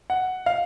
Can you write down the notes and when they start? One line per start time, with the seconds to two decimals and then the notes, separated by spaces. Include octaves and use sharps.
0.10 F#5
0.46 F5